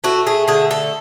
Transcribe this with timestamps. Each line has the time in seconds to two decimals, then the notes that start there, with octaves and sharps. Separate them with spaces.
0.04 A3 F#4
0.27 G#4
0.48 D3 G#4
0.71 A4